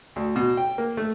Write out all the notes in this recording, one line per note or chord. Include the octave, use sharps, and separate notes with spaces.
D2
B2
G5
A#3
A3